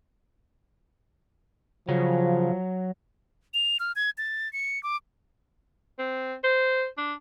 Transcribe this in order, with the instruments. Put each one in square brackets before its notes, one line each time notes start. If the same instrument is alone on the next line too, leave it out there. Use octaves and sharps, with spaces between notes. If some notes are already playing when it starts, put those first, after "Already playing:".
[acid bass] C#3 [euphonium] F3 [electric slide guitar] F#3
[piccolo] F7
F6
G#6
A6
C#7
D6
[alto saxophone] C4
C5
D4